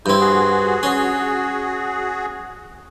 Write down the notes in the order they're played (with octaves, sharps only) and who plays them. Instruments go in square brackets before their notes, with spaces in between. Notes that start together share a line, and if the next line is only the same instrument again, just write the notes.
[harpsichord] G2 C4 [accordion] E4 G6
[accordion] F#4 G#4
[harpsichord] C#4